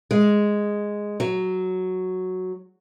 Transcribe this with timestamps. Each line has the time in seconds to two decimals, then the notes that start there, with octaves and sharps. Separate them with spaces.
0.11 G#3
1.20 F#3